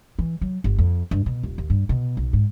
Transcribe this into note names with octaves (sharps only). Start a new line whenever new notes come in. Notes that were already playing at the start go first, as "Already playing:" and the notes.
E3
F#3
G1
F2
G2
B2
D#1
D#2
G2
B2
B1
G#2